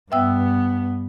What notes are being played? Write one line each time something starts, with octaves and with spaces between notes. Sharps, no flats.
G2 B3 E5 G5 E6